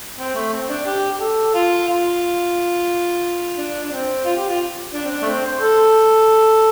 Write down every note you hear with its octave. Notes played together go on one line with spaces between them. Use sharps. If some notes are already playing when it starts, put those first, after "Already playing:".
C4
A3
C4
D4
G4
G4
A4
F4
F4
D4
D4
C4
F4
G4
F4
D4
C4
D4
A3
C4
C5
A4